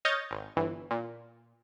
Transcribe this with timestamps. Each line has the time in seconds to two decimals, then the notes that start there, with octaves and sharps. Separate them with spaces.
0.05 C#5 D#5 F6 G6 A6
0.31 G#1
0.56 G1 E3
0.91 A#2